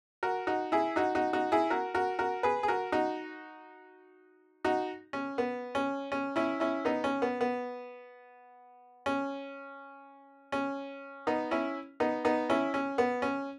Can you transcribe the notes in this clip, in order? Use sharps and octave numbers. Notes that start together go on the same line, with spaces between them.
F#4 A#4
D#4 F#4
E4 G#4
D#4 F#4
D#4 F#4
D#4 F#4
E4 G#4
F#4 A#4
F#4 A#4
F#4 A#4
G#4 B4
G#4
F#4 A#4
D#4 F#4
D#4 F#4
C#4
B3
C#4
C#4
C#4 E4
C#4 E4
B3 D#4
C#4
B3
B3
C#4
C#4
B3 D#4
C#4 E4
B3 D#4
B3 D#4
C#4 E4
C#4
B3
C#4